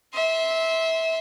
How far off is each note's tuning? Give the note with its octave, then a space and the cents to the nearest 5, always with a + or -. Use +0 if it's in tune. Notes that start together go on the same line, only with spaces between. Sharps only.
E5 -20 C6 +0